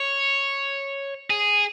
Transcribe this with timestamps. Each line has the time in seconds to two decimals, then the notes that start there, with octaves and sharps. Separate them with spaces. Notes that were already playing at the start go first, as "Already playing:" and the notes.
Already playing: C#5
1.30 G#4